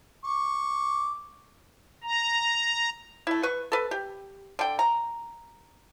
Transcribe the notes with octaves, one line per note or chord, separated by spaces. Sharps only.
C#6 D6
A#5
A3 E4
B4 C#6
A4 B4
G4
D3 G5
A#5